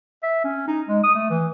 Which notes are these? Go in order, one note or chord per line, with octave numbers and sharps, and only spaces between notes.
E5
C#4
D#4
G#3
D#6
A3
E3